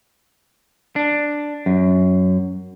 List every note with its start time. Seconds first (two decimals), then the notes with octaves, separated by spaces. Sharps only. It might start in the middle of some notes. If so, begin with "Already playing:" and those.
0.96 D4
1.66 F#2